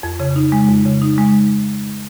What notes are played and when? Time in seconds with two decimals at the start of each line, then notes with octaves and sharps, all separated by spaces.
0.03 F2
0.20 C#3
0.36 D#4
0.52 G#3
0.69 F2
0.85 C#3
1.02 D#4
1.18 G#3